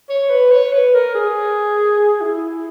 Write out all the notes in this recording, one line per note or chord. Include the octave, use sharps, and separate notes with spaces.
C#5
B4
C#5
B4
A#4
G#4
E4